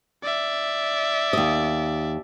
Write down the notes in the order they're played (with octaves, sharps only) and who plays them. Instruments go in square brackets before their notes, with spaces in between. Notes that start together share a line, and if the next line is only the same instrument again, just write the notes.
[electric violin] D5 E5
[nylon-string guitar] D#2 D#5